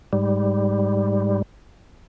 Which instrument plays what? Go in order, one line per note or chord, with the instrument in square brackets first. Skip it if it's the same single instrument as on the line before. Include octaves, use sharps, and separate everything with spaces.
[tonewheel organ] G#2 G3